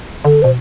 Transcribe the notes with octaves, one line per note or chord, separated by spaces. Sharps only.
D3 A4
B2 C5